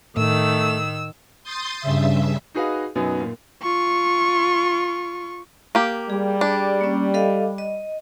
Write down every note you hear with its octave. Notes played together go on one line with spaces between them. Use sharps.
A2 D#3 A3 E6
C6 D#6 G6 A6
G2 C#3 E5
D#4 F#4 G#4 B4 D#5 F5
F#2 B2 F#3 B3 D#4
A#2 A#3
F4 C#6
A#3 G4
G3 G#4
D4
A#3 C#4
A4 D#5 F5
D#5